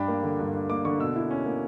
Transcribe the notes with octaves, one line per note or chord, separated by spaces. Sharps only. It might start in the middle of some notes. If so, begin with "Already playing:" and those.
Already playing: G2 D4 G5 B5
A#3
D3
G2
D4
A#3 D6
D3 C#6
B2 E6
E4
C#4
A#3